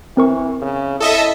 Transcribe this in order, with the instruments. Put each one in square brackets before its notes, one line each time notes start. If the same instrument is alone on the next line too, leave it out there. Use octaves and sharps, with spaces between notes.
[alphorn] E3 [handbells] C4 A#4 C#6
[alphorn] C#3
[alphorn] E4 [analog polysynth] A4 D#5 E5